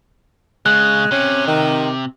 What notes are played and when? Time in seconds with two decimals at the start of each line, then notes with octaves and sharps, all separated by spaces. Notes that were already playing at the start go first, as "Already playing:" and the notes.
0.66 C#3 G#3 F#6
1.11 C3 C#4
1.47 D#3